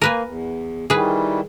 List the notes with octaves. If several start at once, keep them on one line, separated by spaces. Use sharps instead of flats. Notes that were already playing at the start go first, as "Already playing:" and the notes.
A#3 A#4 B4 G#5
E2
D#3 E3 G3 G#4 B4